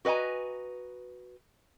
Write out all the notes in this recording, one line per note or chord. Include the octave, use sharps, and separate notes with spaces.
F#4 B4 D#5 G#5 A#5